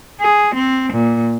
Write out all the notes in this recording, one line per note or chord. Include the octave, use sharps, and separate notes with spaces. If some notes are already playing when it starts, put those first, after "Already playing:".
G#4
C4
A#2